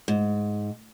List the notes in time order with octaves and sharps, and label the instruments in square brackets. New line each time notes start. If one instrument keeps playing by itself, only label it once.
[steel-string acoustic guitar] G#2